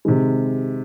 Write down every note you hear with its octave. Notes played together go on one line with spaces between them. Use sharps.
C3 D#3 G#3